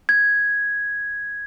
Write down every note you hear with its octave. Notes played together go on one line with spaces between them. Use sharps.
G#6